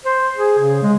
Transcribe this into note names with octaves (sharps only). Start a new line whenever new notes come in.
C5
G#4
C#3
G#3